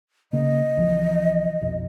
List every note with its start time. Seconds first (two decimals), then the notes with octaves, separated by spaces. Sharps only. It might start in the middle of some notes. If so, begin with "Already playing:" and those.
0.33 C#3 A#3 D#5
0.77 C2 E3 F3
1.61 F#1 B1 F2